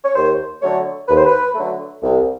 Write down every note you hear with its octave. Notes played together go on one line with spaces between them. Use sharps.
C#5
D#2 C5
D3 F#3 A3 C#5
D#2 B4
C5
B4
D3 F#3 A3
C2